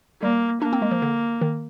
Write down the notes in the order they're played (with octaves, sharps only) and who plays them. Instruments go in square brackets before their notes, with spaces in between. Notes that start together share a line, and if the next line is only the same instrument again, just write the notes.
[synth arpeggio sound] G3 [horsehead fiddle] A#3
[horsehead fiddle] A#3 [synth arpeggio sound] D4
[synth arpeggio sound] C4
G#3
F3
D3
D#3